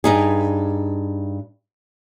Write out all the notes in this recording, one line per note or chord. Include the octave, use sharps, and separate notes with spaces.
G2 D#4 G#4